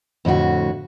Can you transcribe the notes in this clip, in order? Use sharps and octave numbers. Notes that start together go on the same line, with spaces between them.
F2 A2 D3 F#4